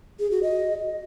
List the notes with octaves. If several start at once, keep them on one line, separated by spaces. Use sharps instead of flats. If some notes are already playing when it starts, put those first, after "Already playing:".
G#4
F#4
D#5